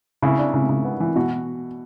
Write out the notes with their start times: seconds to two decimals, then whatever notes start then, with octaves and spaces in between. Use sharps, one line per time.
0.22 C#3 E4
0.39 D4
0.54 C#3
0.69 C#3
0.85 B3
1.00 E3
1.16 B2 F#4